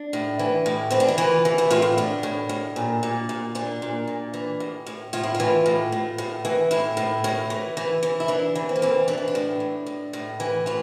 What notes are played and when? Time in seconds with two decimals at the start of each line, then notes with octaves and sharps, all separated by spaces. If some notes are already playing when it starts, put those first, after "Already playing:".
Already playing: D4
0.13 A2
0.39 E3
0.66 A2
0.91 E3 C4
1.00 D4
1.08 E4
1.18 E3 F4
1.45 E3
1.58 E4
1.71 A2 F4
1.82 E4
1.98 A2 D4
2.23 A2
2.49 A2
2.76 A#2
3.03 A#2
3.29 A#2
3.55 A#2 D4
3.82 A#2
4.08 A#2
4.34 E3
4.60 A2
4.86 A2
5.13 A2 F4
5.23 E4
5.35 F4
5.40 E3
5.66 A2
5.92 A2
6.18 A2
6.45 E3
6.71 A2 E4
6.97 A2
7.24 A2
7.50 E3
7.77 E3
8.03 E3
8.20 E4
8.28 E3 D4
8.55 E3
8.69 C4
8.76 A#3
8.82 E3 C4
9.08 E3 D4
9.18 C4
9.28 D4
9.35 A2
9.60 A2
9.87 A2
10.13 A2
10.40 E3
10.66 E3 F4